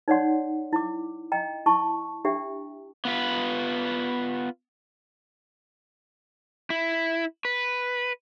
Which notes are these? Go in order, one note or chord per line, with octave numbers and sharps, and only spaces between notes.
D#4 C#5 D5 F#5 C6
E4 D6
D#5 G5 A#5
E4 A5 C#6
D4 G4 E5 G5
B3 F4 B4
E4
B4